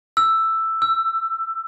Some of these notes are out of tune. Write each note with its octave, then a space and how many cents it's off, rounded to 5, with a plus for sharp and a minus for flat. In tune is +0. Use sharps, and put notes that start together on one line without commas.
E6 +5
E6 +20